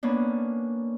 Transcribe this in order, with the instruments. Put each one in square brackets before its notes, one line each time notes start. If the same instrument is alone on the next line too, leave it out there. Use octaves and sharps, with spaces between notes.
[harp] A#3 B3 C#4 D4